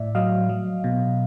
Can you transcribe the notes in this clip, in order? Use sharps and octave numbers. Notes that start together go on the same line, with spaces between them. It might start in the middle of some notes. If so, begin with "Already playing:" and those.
Already playing: A2 D5 E5
F#3 D#5 F5
F#3
B2